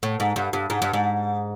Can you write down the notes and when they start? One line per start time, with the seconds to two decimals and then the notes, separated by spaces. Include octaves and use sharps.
0.03 A2
0.20 G#2
0.36 G2
0.53 G2
0.70 G#2
0.82 G2
0.93 G#2